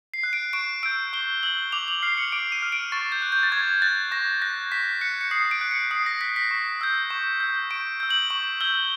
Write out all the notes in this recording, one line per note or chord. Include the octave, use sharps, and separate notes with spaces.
C7
F#6
D7
C#6 D7
E6 G6 D7
C#6 G7
E6 G6 F#7
D6 F7
F#7
F6 C7
C#7
D6 D7
D#7
F6
D7
C#6 A6
G6
F#6
G6
A6
C#6 G#6
F#6 A6
C#6 A#6
F#6 A#6
C#6 B6
F#6 C#7
C#7
D#6 C7
D7
F#6
C#7
D#6 C7
A#6
F#6 B6
B6
C#6
E6 G6
C#6
E6 G6
C#6 D7
E6 G6
F#7
C#6 F#7
E6 G6 G7